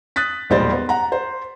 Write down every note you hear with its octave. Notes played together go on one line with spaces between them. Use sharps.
D#6 F#6 A6 B6
E1 A#1 G3 D#4 C5 A6
B3
F#5 A#5
C5